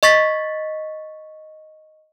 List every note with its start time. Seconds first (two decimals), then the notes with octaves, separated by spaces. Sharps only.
0.03 D#5 C#6 A6 B6